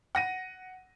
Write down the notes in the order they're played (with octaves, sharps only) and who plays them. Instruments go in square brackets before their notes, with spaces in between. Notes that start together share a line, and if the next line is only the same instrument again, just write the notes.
[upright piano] F#5 A#6 D#7